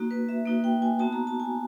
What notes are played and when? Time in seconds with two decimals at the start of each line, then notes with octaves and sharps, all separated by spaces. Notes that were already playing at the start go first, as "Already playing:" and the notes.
Already playing: A#3 D#4 F#4
0.11 B4
0.29 E5
0.45 A#3 D#4 F#4
0.64 G5
0.82 G#5
0.99 B3 D#4 F#4 A5
1.13 A#5
1.27 A5
1.40 G#5